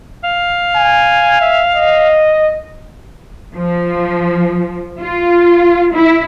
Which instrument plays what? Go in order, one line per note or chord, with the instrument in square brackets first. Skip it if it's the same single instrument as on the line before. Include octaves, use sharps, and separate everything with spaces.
[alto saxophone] F5
[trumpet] G#5
E5
D#5
[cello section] F3
F4
E4